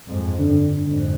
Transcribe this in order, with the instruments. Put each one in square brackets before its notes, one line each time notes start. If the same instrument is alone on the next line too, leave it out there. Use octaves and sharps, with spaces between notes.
[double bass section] F2 G#2
[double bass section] G2 [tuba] D3
[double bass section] F2 G#2 [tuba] D3